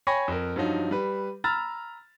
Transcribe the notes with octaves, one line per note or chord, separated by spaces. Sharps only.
C#5 G5 G#5 B5 C#6 A#6
F2 A#4
G2 F3 F#3 D#4
G3 B4
A#5 B5 E6 F6 A6